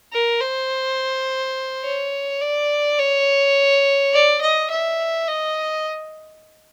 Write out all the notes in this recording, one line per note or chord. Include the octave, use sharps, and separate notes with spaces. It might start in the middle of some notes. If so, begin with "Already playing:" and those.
A#4
C5
C#5
D5
C#5
D5
D#5
E5
D#5